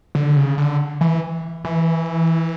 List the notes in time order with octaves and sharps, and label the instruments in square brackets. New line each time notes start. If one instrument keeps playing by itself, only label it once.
[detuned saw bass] D3
C#3
D3
E3
E3